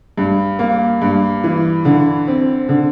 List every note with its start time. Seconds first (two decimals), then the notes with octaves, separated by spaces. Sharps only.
0.18 G2
0.59 A#3
1.02 G2
1.44 E3
1.85 D3
2.27 C4
2.69 D3